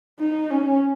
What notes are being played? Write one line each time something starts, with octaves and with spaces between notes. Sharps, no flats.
D#4
C#4